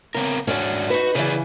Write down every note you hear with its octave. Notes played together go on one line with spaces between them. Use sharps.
C#3 B3 C4 A#4
G#2 C#4 D4 F#4 C#5 D5
D#4 F#4 B4
C#3 E3 G#4 B4 D5